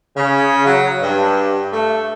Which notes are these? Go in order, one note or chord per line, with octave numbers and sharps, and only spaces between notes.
C#3
F#3
G2
A3